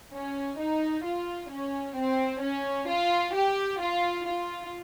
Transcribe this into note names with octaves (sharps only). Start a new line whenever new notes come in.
C#4
D#4
F4
C#4
C4
C#4
F4
G4
F4
F4